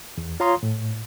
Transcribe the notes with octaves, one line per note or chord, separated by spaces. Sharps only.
E2
F4 C#5 F5 A#5 C6 D#6
A2